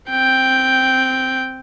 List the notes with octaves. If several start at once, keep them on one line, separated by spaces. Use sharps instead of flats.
C4 G5